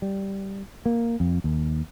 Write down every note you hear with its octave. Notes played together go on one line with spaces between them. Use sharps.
G3
A#3
F2
D#2